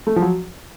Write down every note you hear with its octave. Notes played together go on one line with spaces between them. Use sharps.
A3
F3
F#3